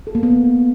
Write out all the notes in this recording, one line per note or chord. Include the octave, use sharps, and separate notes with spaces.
A4
A#3
B3